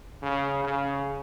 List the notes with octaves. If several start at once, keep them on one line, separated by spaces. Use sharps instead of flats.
C#3
C#3